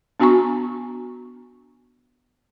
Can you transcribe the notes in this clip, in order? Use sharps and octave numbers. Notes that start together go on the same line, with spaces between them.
B3 D4 F#4 G#5 A#5 C#6